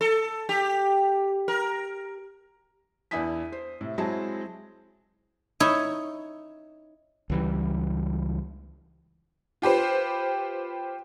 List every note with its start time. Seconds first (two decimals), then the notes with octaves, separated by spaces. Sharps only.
0.01 A4
0.49 G4
1.48 A#4
3.11 E2 D4 E4 G#5 D#6 B6
3.52 C5
3.81 A2 C3
3.98 F#3 G#3 C4 E4 A5
5.60 D#4 E4 C#5
7.30 C#2 E3 G3
9.62 F4 G4 B4 C5